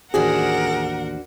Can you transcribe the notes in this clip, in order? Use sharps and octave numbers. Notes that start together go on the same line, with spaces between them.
A1 D#2 D4 F#4 G#4 A#4 C5 F#5